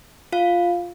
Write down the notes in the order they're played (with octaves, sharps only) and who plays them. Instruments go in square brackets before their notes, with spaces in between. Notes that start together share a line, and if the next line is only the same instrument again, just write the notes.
[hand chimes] F4 F5